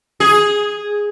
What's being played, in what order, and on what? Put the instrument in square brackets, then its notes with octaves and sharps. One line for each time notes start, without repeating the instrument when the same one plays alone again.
[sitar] G#4